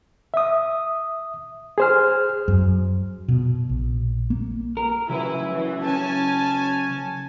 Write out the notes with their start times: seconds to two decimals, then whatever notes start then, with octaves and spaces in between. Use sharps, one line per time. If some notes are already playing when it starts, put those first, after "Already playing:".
0.34 E5 D#6
1.78 G#4 C5 F6
2.48 F#2
3.28 B2
3.69 A#1
4.30 A#3
4.77 A#4
5.10 C#3 F#3 E4 B4
5.52 E3
5.83 C#4 G#5 A5